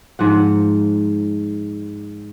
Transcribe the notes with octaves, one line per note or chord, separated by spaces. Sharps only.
G#2 F3 F#5